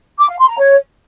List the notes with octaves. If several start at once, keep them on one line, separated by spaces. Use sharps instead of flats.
D6
F5
C6
A#5
C#5